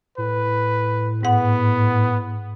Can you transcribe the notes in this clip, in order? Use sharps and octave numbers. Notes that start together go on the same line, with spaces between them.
A2 B4
G#2 B3 F#5